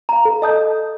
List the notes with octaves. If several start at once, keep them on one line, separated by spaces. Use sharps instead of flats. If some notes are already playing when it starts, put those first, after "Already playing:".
F5 A#5
A4
D#5 A5 D#6 G6